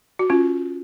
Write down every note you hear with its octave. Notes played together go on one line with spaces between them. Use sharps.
F#4
C#4 F4